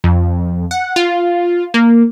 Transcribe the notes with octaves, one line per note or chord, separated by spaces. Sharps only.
F2
F#5
F4
A#3